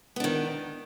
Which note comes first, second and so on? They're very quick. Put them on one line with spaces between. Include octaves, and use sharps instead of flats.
B3 D4 D#3